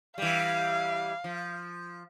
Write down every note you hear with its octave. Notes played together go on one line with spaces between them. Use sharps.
E3 G3 F5
F3